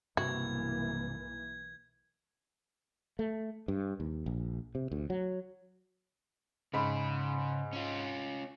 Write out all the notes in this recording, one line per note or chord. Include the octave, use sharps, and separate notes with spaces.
B1 G2 C3 E3 A#3 F#4 G#6
A3
G2
D#2
A#1
C3
D2
F#3
G#2 C#3 B5
C#4 F4